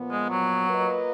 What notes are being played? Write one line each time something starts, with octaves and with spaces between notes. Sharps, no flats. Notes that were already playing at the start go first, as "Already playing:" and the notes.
Already playing: A#2 F3 B3
G#3
F#3
A#3 F4 B4 D#5